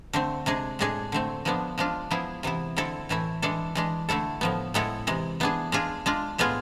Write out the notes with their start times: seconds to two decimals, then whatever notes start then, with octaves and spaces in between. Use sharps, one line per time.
0.13 D3 A3 C4
0.46 C3 G#3 D4 G#4
0.79 A2 G#3 D4 G#4
1.12 D3 A3 C4
1.45 F3 G#3 B3 D4
1.78 F3 G#3 D4 F4
2.11 F3 B3 E4 G#4
2.43 C3 E3 B3 E4
2.77 D3 G#3 C4 E4 A4
3.09 A2 E3 A3 E4
3.42 E3 G#3 D4 A4
3.75 E3 G#3 D4
4.09 D3 A3 E4 A4
4.41 A2 F3 B3
4.74 A2 G#3 B3 E4 A4
5.07 C3 E3 G#3
5.40 E3 B3 D4 G#4
5.72 G#3 D4 F4 G#4
6.06 G#3 D4 F4
6.38 A2 G#3 B3 F4 G#4